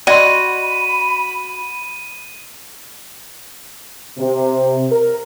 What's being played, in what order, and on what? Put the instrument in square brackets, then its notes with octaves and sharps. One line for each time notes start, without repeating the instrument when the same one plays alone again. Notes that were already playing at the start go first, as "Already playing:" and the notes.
[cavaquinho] F#4 [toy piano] D5 D#5 C6 [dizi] B5 [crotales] D#7
[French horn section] C3
A#4